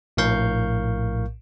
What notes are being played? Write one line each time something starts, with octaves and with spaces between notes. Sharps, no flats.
A#1 A2 A#4 F5 C#6 G6